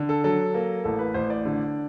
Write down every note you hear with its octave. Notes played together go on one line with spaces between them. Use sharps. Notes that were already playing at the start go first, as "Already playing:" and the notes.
Already playing: D3
A4
F#3 A4
A#3
A1 A4
B4
A1 C5
D5
D3